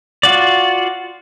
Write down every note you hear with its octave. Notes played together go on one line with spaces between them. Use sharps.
F4 F#4 D5